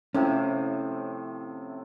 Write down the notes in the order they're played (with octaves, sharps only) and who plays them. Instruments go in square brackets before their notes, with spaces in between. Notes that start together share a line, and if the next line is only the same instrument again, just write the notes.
[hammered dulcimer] A2 C3 F3 [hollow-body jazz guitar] C#4 E4